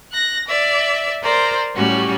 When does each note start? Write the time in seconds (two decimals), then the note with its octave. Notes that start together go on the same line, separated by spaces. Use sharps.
0.11 F#6 A#6
0.48 D5 E5
1.23 A#4 C5 D5 A#5
1.75 A2 G3 C#4 F#4 G4